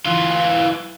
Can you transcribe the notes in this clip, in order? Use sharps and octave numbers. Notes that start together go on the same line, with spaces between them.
E3 F4